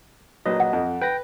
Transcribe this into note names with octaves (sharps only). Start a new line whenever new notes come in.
A#1 F#3 B4 D#5
F#5
F2
B4 G5 A#6